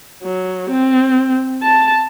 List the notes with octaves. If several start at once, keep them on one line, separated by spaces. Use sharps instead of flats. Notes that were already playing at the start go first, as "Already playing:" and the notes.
F#3
C4
A5